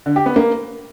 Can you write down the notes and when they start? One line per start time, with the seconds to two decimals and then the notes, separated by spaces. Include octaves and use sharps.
0.06 D3
0.16 G4
0.26 B3
0.36 A#3